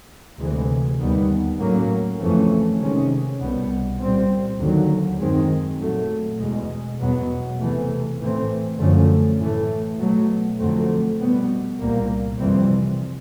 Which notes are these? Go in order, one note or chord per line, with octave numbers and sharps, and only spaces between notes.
D2 C3 E3 G#3
D#2 D#3 G3 B3
A2 F#3 A#3 C#4
F2 C#3 E3 A3 C#4
C3 D#3 G#3 C#4
C2 B2 G3 B3
A#2 G3 C4
D#2 D3 F#3
F#2 D#3 G#3 C4
A#2 F#3 A3
E2 B2 G#3
E2 B2 F#3 B3
E2 C3 E3 A3
A2 E3 A3 C4
F#2 D3 F3 A3 C#4
A2 E3 A3
B2 F#3 A3
F2 D3 F#3 A3 C4
B2 G3 B3
C2 A#2 G3 A#3
F2 C3 E3 G3 C4